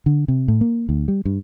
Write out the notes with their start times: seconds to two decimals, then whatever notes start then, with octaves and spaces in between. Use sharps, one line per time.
0.06 D3
0.28 C3
0.48 A2
0.61 A#3
0.89 D2
1.08 G3
1.25 G2